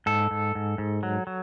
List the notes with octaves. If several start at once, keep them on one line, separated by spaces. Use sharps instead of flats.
G#2 A4
G#2
G#2
G#2
F#3
F#3